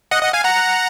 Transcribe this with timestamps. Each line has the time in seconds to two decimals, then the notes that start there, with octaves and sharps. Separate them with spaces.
0.11 D#5 F#5
0.23 D#5 F#5
0.33 F5 G#5
0.44 F#5 A#5